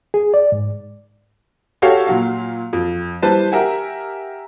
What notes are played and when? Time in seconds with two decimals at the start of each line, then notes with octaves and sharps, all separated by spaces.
0.14 G#4
0.34 D5
0.52 G#2
1.82 F#4 G4 A4 C#5 F5
2.07 A#2 F#3 F5
2.73 F2
3.22 G3 E4 B4 C5 A5
3.52 G4 A#4 E5 F#5 G#5